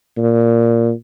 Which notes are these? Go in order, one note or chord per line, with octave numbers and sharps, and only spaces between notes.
A#2